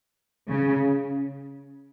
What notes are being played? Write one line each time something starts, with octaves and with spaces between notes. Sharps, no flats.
C#3